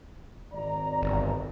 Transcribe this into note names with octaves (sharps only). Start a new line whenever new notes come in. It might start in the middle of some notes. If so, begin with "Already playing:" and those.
G#1 D5 A#5
G1